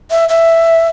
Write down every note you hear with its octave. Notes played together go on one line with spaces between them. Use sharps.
E5
E5